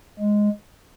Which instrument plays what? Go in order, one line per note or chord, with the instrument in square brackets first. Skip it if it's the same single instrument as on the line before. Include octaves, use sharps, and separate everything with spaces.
[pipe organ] G#3